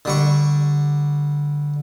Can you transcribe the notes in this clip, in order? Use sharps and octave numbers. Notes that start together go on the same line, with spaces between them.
D3 G3 C#6